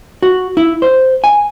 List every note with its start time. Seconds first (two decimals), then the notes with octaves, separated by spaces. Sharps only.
0.22 F#4
0.57 E4
0.82 C5
1.24 G#5